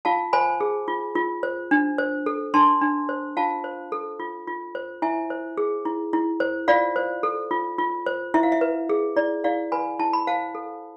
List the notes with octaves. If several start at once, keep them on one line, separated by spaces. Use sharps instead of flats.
F4 F5 A5
C5 G#5 B5
G#4
F4
F4
C5
D4
C5
A4
D4 A5 C6
D4
C5
F4 F5 A5
C5
A4
F4
F4
C5
E4 E5 G#5
C5
G#4
E4
E4
C5
F4 D5 F5
C5
A4
F4
F4
C5
E4 E5
F5
E5
B4
G#4
E4 D5
E4 D5 F5
B4 G#5 B5
E4 A5
B5
C5 F5 A5
A4